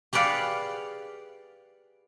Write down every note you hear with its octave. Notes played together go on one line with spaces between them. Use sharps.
G4 G#4 B4 D5 F5 F#5